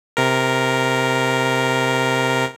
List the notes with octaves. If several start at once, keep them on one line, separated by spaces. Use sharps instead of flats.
C3 A#4